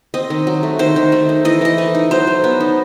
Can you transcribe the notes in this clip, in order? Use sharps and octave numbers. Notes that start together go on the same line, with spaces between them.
C4 D#5
D#3
F#3
A3
D#3 C5
D#3
A3
D#4
E3 D#5
E3 D#5
A3
D#4
F#3 C5
F#3
B3
D#4